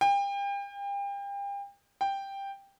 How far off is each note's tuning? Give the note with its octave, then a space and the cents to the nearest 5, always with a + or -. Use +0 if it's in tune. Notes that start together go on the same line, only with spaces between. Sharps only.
G5 +35
G5 +5